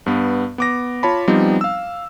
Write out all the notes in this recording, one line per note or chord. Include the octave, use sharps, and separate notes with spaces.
G2 B3
B3 D6 A#6
F4 C#5 A5 B5
F3 G3 B3 C4 D#4
F5 E6